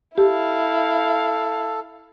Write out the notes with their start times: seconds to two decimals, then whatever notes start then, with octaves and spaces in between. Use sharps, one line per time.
0.18 E4 G4 A4 F5